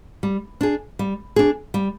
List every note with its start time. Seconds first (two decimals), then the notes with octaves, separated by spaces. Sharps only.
0.23 G3
0.61 D4 G#4
0.99 G3
1.36 D4 G#4
1.74 G3